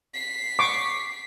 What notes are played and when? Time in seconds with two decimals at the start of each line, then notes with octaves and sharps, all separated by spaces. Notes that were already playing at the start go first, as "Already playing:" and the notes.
0.14 B6 C7
0.59 C#6 D6